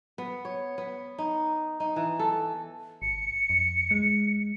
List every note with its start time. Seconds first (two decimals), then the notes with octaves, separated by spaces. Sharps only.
0.18 B3
0.45 C#5
0.78 B3
1.18 D#4
1.80 D#4
1.96 E3
2.19 A4
3.02 G#1 C#7
3.50 F2
3.91 G#3